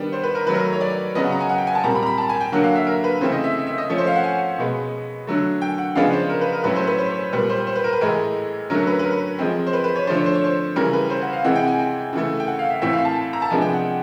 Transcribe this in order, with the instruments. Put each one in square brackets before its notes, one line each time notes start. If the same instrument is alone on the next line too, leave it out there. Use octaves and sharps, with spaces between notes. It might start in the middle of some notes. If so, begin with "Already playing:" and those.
Already playing: [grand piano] D#3 G3 B3 D4
C5
B4
A#4
D#3 F#3 A3 B4
A#4
C#5
D5
C#3 F#3 B3 D#5
F#5
A#5
G#5
F#5
G5
G#5
A5
A#2 G3 C4 A#5
B5
A#5
B5
A5
G#5
G5
D3 F#3 A#3 F#5
F5
E5
A#4
B4
C#3 E3 A3 C4 C5
D#5
E5
E5
D#5
F3 A3 C#4
C5
F5
F#5
G#5
B2 G#3 B3
D3 F#3 A3
G5
F#5
C#3 F3 G#3 B3 D4 F5
C5
A#4
B4
A#4
A2 F#3 A3 C#4 B4
C5
B4
C5
C#5
A#2 G3 B3 B4
C5
C5
B4
A#4
B4
A2 E3 G#3 A#4
D3 F#3 A3 C#4 A#4
B4
B4
A#4
F3 G#3 C4
C5
B4
B4
C#5
D3 F3 A3 D4 C5
C#5
C5
C#5
C5
C#3 E3 G3 A#4
B4
C5
F#5
F5
C3 E3 G#3 C4 F#5
G5
G#5
G5
C#3 E3 A3
G5
F#5
F5
E5
A2 E3 A3 C4 E5
F5
A5
A#5
A5
C3 F3 G#3 B3 D4 G#5
G5
F#5